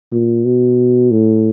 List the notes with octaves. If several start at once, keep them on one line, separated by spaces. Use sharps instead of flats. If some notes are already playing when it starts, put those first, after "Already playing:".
A#2
B2
A2